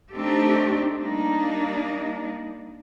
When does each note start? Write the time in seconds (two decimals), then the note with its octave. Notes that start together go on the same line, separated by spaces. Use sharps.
0.11 A3 C4 D4 D#4 G4 A4
1.00 G3 A#3 D4 D#4